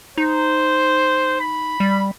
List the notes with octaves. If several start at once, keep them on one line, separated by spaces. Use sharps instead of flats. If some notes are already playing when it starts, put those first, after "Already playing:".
D#4 C5
B5
G3